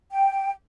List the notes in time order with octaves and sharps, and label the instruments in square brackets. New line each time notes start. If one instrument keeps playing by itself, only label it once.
[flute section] G5